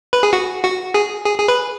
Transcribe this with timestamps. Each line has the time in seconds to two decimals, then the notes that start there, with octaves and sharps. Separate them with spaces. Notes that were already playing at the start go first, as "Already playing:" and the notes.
0.13 B4
0.23 G#4
0.33 F#4
0.64 F#4
0.94 G#4
1.25 G#4
1.38 G#4
1.48 B4